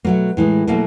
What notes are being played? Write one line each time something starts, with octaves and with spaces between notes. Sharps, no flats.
B2 F#3 A3 A#3
A2 E3 G#3
B2 F#3 A3 A#3